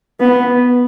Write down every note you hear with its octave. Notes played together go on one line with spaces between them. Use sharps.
B3